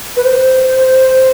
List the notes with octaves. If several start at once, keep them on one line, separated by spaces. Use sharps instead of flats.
B4
C5